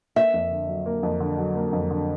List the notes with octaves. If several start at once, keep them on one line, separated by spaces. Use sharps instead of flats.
A#3 E5
F2
D3
F#3
A#3
F2
D3
F#3
A#3
F2
D3